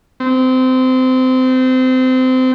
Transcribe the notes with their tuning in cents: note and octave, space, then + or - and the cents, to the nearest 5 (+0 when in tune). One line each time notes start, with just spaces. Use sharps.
C4 -25